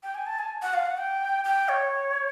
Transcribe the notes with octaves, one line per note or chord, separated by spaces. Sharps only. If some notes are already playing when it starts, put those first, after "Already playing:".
G5
G#5
A5
G#5
F#5
F5
F#5
G5
G5
C#5